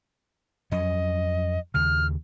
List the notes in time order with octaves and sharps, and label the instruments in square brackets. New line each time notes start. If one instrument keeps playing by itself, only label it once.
[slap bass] F2 F#3 C#4 [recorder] D#5
[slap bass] D#2 C#3 [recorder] F6